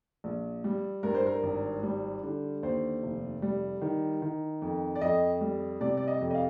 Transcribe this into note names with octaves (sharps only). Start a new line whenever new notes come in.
A#1
G3
G2 A#4
C5
A#4
G#1
G3
D3
D#2 C5
F1
G3
D#3
D#3
F2
D5
F2 D#5
G3
C3 D5
D5
D#5
F2
D#5
F5